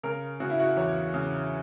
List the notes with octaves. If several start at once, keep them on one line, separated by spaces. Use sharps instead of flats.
C#3 A#4
C#3 F#4
E4
F#4
E2 C#5
C#3